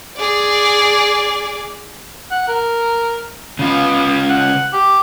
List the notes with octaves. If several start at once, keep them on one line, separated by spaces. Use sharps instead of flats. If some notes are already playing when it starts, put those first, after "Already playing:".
G#4 D5
F#5
A#4
C#3 B3 F4
F#5
G4